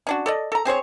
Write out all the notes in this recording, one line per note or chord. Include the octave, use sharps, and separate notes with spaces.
C#4 D4 F#4
A4 D5 D#5
A4 A#5
C4 G#4 C5 C#5